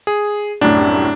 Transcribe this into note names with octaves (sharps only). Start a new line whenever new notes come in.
G#4
C2 F#2 A2 D4